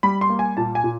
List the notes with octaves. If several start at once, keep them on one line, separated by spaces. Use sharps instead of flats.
G3 B5
C6
A#3
G#5
A#2 A5
G#5
A#2